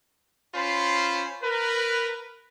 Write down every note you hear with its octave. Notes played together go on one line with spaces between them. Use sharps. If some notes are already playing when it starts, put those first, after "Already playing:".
C#4 F4 C5 B5
A#4 B4